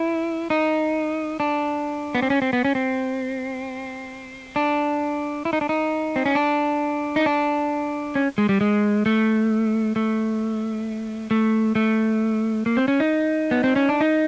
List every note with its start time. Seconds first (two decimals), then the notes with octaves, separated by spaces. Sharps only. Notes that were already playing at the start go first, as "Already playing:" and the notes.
Already playing: E4
0.50 D#4
1.40 D4
2.15 B3
2.22 C4
2.30 C#4
2.42 C4
2.53 B3
2.65 C#4
2.75 C4
4.56 D4
5.45 E4
5.53 D#4
5.61 D4
5.69 D#4
6.16 C4
6.26 C#4
6.35 D4
7.16 D#4
7.26 D4
8.15 C#4
8.38 G#3
8.49 G3
8.61 G#3
9.06 A3
9.96 A3
11.31 A3
11.75 A3
12.66 A#3
12.77 C4
12.88 C#4
13.00 D#4
13.51 B3
13.64 C4
13.76 C#4
13.89 D4
14.01 D#4